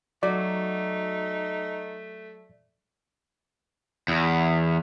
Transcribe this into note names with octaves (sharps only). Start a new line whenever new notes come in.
F#3 A3 D#4 F#4 D5
E2